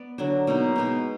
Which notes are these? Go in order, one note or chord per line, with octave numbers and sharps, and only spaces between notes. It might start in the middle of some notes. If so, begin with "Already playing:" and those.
Already playing: B3 D5
D3 F#3 D4 F#4
B2 A#3 D#4
B2 G#3 D#4